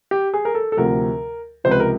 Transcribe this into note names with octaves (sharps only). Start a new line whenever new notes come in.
G4
G#4
A#4
A4
A4
D2 C3 F3 A#4
C#2 C3 F3 C5
B4
A#4